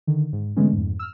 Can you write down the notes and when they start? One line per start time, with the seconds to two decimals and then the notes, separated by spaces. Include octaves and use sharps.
0.07 D3 D#3
0.33 G#2
0.56 D3 E3 G#3 A3 B3 C#4
0.73 F2 G#2
0.99 E6 F6